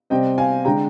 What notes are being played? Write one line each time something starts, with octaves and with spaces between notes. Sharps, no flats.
C3 G3 C4 D#5 G5
F5 G#5
D3 G#3 D4 G5 A#5